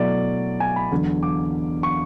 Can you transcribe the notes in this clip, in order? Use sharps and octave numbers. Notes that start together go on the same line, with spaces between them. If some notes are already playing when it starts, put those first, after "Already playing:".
Already playing: B2 F#3 A3 E4 D5
G#5
B5
E2 D3 F#3
D6
C#6